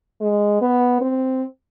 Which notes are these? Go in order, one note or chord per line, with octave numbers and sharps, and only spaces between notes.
G#3
B3
C4